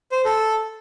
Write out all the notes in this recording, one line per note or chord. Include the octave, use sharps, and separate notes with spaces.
C5
A4